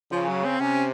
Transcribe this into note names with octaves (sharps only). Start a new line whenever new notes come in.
C#3 F3
F#3
C4
C3 C#4